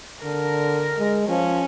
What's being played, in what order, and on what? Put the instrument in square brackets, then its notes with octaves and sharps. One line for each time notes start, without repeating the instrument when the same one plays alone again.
[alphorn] D3 [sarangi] A#4
[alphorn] G#3
[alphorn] F3 [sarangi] C#4